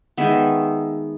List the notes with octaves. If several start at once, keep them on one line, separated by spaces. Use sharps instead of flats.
D#3 G#3 B3 E5